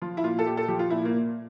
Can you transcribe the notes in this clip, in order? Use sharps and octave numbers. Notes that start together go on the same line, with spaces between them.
F3 F4
E4
A#2 F4
A4
A#2 G4
A4
F3 G4
F4
A#2 E4
A#3
A#2